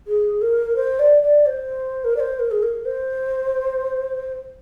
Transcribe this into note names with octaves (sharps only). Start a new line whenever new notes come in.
G#4
A#4
C5
D5
D5
C5
A#4
D5
C5
A#4
G#4
A#4
C5